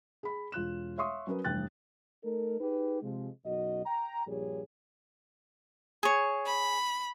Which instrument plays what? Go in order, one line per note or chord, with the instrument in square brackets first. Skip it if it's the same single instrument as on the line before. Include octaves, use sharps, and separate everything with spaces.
[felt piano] G#4 B5
E1 F4 F#6 E7
C#5 E5 F5 C6 C#6 D#6
F#3 C#4 A#4 B4
F1 G2 E3 G5 F#6 A6
[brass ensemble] A3 D#4 A4 A#4
D#4 G4 G#4 B4
C3 F3 G#3
B1 F#2 F#4 D#5
G5 A#5
A#1 G2 G3 G#4 C#5
[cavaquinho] G#4 C#5
[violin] B5